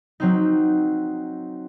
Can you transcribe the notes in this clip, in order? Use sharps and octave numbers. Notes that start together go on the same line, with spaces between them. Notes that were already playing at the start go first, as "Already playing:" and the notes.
F#3 C4 D#4